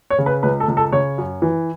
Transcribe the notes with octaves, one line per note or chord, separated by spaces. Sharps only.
C#5
C#3
B4
C#2 B4
A4
C#2
A4
C#3 C#5
F#2
E3